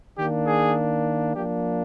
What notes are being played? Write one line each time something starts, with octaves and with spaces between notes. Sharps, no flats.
D#3 A#3 D4 G4
G#4
F3 A#3 D4 G4